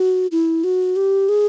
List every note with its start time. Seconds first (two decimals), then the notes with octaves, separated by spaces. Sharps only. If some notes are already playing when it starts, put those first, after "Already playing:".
Already playing: F#4
0.32 E4
0.64 F#4
0.96 G4
1.29 G#4